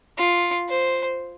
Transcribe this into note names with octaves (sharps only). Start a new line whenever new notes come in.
F4
C5